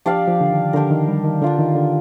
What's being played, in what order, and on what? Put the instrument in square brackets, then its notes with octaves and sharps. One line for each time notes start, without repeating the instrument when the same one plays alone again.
[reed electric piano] F3 [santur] D4 G4 D5 F5
[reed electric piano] F3
D3
D#3
[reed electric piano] D3 [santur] D4 G4 A#4
[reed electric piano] D#3
G3
D#3
[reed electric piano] D3 [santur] D4 F4 A#4
[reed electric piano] D#3
D3